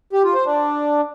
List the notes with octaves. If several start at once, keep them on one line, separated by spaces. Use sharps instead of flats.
G4
F4
C5
D4